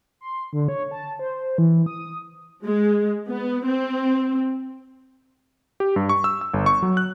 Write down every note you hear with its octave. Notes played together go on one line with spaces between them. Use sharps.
C6
D3
C#5
A5
C5
E3
D#6
G#3
B3
C4
G4
G2
C#6
E6
E6
G1
C#6
F#3
F#6